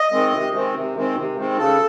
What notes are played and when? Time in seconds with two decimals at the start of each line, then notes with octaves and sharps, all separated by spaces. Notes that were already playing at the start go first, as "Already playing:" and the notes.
Already playing: D#5
0.12 D#3 G#3 C4
0.32 C3
0.54 D#3 G#3 C4
0.74 C3
0.95 D#3 G#3 C4
1.15 C3
1.36 D#3 G#3 C4
1.57 C#3 A4